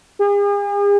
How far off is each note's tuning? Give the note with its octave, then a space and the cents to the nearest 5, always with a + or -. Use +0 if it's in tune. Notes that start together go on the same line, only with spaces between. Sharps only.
G#4 -45